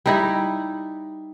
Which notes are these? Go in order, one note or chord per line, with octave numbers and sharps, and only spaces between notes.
G3 D#4 E4